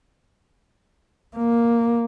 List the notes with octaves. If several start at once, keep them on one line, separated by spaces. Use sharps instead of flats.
A#3